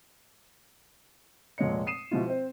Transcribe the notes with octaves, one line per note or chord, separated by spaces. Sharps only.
F1 A#2 G#3 C#5 D#5 C#7
D#6 C7 D#7 E7
B2 F3 G#3 E4 F4
C4 C5